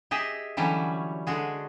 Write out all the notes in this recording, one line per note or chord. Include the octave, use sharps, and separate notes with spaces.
G4 G#4 D#5 E5
D3 E3 F#3 G3 C#4
D3 G#3 F#4 G#4